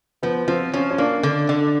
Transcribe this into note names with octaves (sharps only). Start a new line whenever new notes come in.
F3 B3
F3 C4
F3 C#4
C#4
A#3 D4
D3
D3